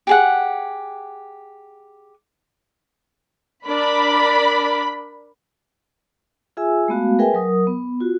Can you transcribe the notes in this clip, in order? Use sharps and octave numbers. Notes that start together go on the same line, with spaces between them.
G4 G#4 F#5
D4 A#4 D5 B5
F4 G#4 E5 G#5 E6
G#3 A3 B3 F#4 F5
G#4 A#4 B4 E5 G5 G#5
F#3 A#4 D#6
B3
F4 F#4